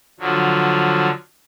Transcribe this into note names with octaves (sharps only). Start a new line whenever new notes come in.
D3 F3 F#3